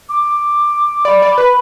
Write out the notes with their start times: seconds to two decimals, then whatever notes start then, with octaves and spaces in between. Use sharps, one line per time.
0.09 D6
1.05 D5 B5
1.22 D5
1.38 B4